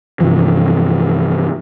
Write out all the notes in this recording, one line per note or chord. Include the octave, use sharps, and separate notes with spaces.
G2 C3 E3 F3